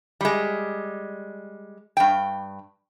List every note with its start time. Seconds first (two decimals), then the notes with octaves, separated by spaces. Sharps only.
0.21 G3 G#3
1.97 G2 G5